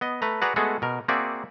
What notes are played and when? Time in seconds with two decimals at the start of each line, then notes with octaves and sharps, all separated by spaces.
0.01 B3 D#5
0.22 A3 B4 A#5
0.42 F#4 G#4 B4 D5 F#5 A#5
0.56 G#3 A3 B3 F#4 G#4 A4
0.82 B2 A#4
1.08 A#3 C4 F#4 G#4 D5 E5